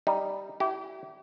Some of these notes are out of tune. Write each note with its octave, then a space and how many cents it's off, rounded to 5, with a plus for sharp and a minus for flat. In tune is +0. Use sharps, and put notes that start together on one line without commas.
G3 +0 D#4 +0
E4 +0 G4 -35